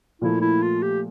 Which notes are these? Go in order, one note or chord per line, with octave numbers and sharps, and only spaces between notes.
A#2 F3 A3 E4
E4
F4
G4